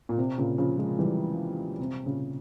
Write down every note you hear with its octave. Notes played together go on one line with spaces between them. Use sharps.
A#2
C3
A#2 C#3
C#3 F3
F3 G#3
E3 G3
C3
A#2 C#3